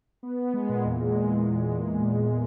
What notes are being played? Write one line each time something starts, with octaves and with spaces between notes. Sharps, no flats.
B3
B3
G#3
A#2
E2
G#3
E2